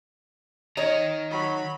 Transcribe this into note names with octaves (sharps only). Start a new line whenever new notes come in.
D#3 C#5 D#5 A#5
F#3 B5